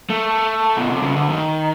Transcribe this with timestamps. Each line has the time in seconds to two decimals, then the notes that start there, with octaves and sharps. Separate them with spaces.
0.10 A3
0.77 B2
0.90 C3
1.03 C#3
1.16 D3
1.29 D#3